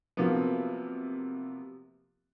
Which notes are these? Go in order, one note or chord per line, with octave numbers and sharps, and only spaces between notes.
C3 F3 F#3 A#3 B3